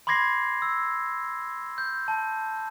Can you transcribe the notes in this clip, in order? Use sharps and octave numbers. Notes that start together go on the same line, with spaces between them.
B5 C6 D6 G#6 A#6 C7
E6
G6
A5